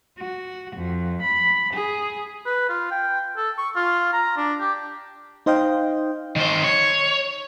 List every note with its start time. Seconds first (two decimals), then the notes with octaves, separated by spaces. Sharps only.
0.18 F#4
0.76 F2
1.22 B5
1.73 G#4
2.46 B4
2.69 F4
2.91 G5
3.37 A4
3.58 C#6
3.76 F4
4.13 A#5
4.37 D4
4.60 G4
5.46 D#4 C5 D#5 F5 G5
6.36 D#3 C5
6.64 C#5